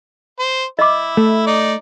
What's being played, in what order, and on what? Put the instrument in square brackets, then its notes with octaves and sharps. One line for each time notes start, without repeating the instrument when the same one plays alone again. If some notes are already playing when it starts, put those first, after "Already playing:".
[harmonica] C5
[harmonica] E4 [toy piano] D#5 D6
[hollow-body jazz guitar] A3
[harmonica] D#4 D5